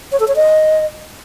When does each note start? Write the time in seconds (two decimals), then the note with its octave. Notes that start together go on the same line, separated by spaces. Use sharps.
0.12 C#5
0.20 A4
0.28 C#5
0.36 D#5